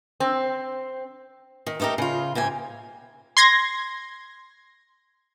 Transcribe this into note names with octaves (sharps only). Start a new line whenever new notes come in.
C4
D#3
A3 B3 D#4 G4 A#4
C#3 F4
G#2 C3 G5 G#5
C6 G#6 A#6